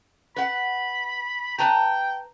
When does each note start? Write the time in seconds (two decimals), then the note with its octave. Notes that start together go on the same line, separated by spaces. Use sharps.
0.36 B4 F#5 B5
1.58 B4 G5 A5 A#5